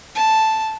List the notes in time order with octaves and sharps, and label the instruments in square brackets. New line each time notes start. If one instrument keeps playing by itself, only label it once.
[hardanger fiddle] A5